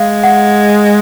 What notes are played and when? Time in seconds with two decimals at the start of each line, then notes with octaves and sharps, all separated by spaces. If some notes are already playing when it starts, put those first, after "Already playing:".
Already playing: G#3 F5
0.24 F#5